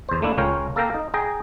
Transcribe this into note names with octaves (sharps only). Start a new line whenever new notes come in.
E2 C5
A3 A#3 D4 E4
C#2 C#4 A#4 C#5 F5 G5
A#3 A4 A#4 F5 G5 A#5
D#4
G#4 G5 A#5